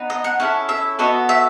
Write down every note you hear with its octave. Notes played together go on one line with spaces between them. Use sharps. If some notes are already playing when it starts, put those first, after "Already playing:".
Already playing: B3 D#4
D#5
F#5
C#4 E4 A4 F#5
E5
B3 F#4 A4 D#5
E5